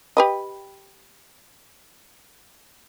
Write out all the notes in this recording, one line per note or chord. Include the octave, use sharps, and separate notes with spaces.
G4 B4 D#5